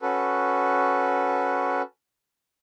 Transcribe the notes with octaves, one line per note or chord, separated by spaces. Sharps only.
C#4 F#4 A4 B4